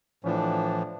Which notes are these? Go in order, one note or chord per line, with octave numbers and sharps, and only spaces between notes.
A2 E3 F3 D4